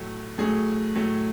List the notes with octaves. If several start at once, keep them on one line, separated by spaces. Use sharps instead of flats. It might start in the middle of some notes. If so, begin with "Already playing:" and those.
Already playing: A2 F#3 A3
A2 F#3 A3 G#4
A2 F#3 A3